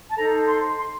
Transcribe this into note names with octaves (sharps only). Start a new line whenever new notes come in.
A5
D#4 A4 C5 A#5
C6
C6